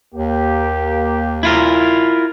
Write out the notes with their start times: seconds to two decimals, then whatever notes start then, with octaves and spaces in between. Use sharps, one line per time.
0.15 D#2 A#3 G4
1.43 E4 F4 A#4